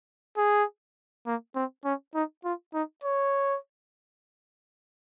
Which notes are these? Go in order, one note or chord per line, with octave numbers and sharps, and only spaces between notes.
G#4
A#3
C4
C#4
D#4
F4
D#4
C#5